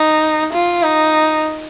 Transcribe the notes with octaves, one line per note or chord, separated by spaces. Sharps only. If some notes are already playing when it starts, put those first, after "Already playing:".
Already playing: D#4
F4
D#4